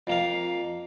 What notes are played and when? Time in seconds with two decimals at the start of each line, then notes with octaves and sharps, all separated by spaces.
0.07 F2 A#3 F5